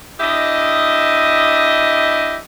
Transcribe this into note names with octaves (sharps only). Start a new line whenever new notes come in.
D4 E4 G4 D#5